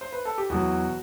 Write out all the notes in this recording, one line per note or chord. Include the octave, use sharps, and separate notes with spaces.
C5
B4
A4
G4
E2 B2 F#3 F#4